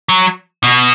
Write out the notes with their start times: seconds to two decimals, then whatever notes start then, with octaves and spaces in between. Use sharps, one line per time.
0.09 F#3
0.64 B2